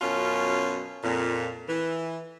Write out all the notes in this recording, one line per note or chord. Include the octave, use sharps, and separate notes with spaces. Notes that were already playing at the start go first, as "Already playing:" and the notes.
F#2 B2 C#4 F4
F2 A#2
E3